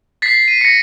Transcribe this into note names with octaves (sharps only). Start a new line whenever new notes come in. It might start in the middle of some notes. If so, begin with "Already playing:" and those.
A6 B6 C7
D#7
A#6 C#7